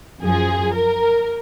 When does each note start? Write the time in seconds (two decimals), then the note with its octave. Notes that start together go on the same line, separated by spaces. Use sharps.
0.22 F#2 F3 G#4
0.74 A#4